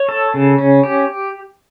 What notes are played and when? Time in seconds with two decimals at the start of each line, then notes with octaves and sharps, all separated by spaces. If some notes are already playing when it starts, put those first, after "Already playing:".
Already playing: C#5
0.09 A4
0.34 C#3
0.58 C#4
0.83 G4